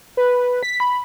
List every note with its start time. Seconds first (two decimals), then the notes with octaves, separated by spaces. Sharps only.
0.17 B4
0.63 B6
0.80 B5